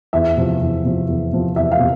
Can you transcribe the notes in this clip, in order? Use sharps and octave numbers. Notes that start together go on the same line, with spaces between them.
E2 E5
C3 F3
E2
C3 F3
E2
C3 F3
E2 E5
F5
C3